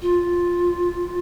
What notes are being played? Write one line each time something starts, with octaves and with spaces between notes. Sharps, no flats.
F4